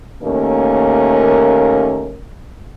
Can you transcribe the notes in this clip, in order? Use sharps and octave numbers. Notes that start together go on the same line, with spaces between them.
D#2 A3 A#3 C#4 A#4